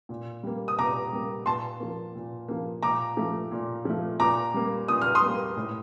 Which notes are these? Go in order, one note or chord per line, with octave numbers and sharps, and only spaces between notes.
A#2
G3 A#3
D#6
A#2 A#5 D6
G3 A#3
A#2 A5 C6
F3 A#3
A#2
F3 A#3
A#2 A#5 D6
F3 A3
A#2
F3 A3
A#2 A#5 D6
G3 A#3
A#2 D#6
F6
C6 D#6
G3 A#3
A2